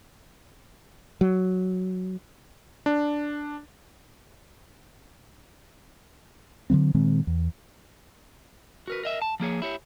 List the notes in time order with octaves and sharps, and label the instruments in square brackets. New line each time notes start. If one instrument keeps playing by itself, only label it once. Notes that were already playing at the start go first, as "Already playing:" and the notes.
[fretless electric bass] F#3
[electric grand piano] D4
[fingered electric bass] D3 E3 F#3 C4
A#2 D#3 G#3 C4
E2
[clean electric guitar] F#4 A#4 B4
A#4 D#5 E5
A5
F3 A#3 G#4 C#5
E4 G4 C#5